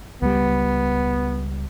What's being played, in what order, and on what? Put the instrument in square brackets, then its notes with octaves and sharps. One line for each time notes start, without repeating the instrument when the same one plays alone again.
[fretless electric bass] C#2 G3 [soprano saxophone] B3